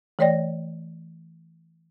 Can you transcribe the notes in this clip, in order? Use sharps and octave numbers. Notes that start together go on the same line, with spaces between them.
E3 A3 C#5 D5 G5 A#6